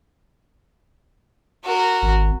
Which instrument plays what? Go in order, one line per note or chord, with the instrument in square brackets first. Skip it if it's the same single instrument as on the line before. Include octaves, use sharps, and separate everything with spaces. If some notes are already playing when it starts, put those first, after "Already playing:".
[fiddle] F#4 A#4
[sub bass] G#1